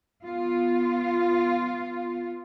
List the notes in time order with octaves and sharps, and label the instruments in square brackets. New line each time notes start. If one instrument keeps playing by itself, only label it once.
[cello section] B3 F4